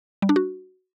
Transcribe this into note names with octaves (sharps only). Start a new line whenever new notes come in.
G3
D4
F#4